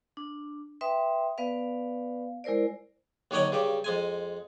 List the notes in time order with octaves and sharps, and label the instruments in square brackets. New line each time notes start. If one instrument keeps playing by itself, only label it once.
[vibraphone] D4
B4 E5 G5 C6 D#6
B3 B4 D5 F5
G#3 E4 A#4 C5 D5
[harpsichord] D#2 D3 F#3 C#5 D#5 G5
G2 C#3 G4
F2 G#3 G#5